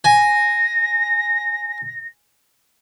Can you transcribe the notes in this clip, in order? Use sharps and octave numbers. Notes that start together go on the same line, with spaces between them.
G#5 A#6